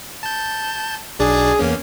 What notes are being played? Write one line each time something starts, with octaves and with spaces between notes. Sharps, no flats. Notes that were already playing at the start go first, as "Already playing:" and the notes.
A5 G6
B1 D4 G#4 D5
E2 A#3 C#4